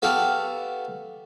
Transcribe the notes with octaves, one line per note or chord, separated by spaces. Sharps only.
B3 F#4 G4 A4 F5